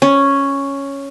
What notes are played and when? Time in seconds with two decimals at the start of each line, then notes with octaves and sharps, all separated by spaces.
0.02 C#4